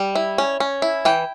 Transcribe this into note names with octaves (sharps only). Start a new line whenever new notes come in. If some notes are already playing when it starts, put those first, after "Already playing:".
Already playing: G3
E4
C#4
C#4
E4
E3 G5